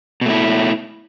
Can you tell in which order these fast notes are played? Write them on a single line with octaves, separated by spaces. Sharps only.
B2 A3 E4